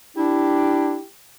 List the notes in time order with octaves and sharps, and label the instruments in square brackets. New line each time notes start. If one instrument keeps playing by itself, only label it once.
[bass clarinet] D4 [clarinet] E4 [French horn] G4